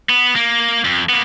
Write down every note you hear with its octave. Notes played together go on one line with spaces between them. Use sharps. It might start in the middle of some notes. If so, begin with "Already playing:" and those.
B3
A#3
F2
A#3 B3